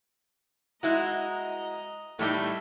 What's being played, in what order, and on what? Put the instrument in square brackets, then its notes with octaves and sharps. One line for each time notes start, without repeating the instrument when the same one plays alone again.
[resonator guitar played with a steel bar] G#3 E4 F#4 [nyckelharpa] D#5 A#5
[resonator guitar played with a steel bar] A2 G3 D#4 [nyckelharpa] A3